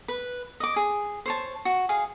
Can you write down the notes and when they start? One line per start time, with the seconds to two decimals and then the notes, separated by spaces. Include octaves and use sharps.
0.08 B4
0.60 D#5 D6
0.76 G#4
1.26 C5 C#5 A5
1.65 F#4
1.89 G#4 F5